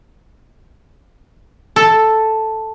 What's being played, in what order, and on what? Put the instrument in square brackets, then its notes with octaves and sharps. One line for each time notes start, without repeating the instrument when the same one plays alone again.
[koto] A4